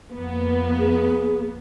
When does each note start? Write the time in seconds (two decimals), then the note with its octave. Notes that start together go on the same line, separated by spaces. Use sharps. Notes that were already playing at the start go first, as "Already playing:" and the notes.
0.11 F2 A#3 B3
0.79 G#4